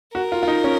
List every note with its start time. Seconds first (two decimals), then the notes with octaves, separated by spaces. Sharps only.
0.15 F#4 A#4
0.32 F4
0.43 F4
0.48 D#4
0.64 C#4